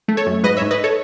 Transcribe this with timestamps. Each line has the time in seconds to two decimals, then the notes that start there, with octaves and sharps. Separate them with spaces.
0.08 A3
0.17 A4 C#5
0.26 F#2
0.43 G#2 B4 D#5
0.57 C#5 E5
0.62 G#2
0.71 B4 D#5
0.84 A4 C#5